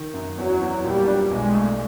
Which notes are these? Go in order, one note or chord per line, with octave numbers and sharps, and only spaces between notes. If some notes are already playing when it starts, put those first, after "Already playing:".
Already playing: D#3
F#2
E2 F#3
E2
A#2 G3
D4
B1 G#3
A3